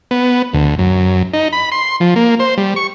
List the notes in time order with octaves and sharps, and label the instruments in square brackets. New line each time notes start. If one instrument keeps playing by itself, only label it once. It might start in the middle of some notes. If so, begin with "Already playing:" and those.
[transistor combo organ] B3
D2
F#2
D#4
B5
C6
F3
A#3
C5
G3
C#6